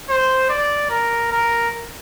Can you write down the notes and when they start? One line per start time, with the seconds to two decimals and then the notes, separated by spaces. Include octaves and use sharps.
0.10 C5
0.50 D5
0.91 A#4
1.32 A#4